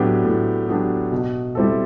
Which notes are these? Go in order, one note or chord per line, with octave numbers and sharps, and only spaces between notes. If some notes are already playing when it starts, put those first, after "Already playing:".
Already playing: A2 F#3 B3 D4 G4
A2
F#3 B3 D4 G4
B2
G3 C4 E4 A4